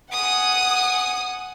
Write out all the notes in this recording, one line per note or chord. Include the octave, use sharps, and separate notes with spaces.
F#5 G#5 D#6